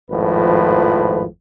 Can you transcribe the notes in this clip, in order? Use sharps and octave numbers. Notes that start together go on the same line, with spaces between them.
G#1 F2 A2 F3 B4